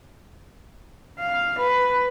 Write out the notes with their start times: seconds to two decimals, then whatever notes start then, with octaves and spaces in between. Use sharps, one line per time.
1.20 F5
1.59 B4